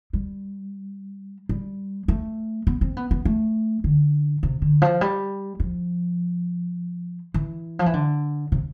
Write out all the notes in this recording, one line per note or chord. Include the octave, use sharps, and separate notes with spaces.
G3
G3
A3
B3
C4
B3
B3
A3
D3
C3
D3
F3
G3
F3
E3
F3
E3
D3
C3